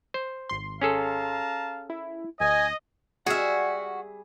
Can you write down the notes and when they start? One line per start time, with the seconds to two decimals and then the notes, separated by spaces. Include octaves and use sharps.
0.14 C5
0.49 G#1 C6
0.81 C#4 G#4 A4 F5 A5 A#5
1.90 E4
2.40 D2 D#5 G#5
3.26 G3 F#4 G#4 E5 F#5 F6